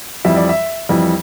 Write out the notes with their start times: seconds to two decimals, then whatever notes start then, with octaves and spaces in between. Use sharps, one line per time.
0.25 F2 E3 G3 E5
0.37 D5
0.49 E5
0.89 F2 E3 G3